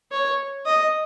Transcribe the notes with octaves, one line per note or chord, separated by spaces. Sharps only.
C#5
D#5